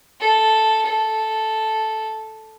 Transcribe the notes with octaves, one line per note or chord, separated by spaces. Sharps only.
A4
A4